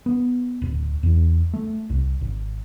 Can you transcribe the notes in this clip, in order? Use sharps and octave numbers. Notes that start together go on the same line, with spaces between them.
B3
D1
E2
A3
C2
G#1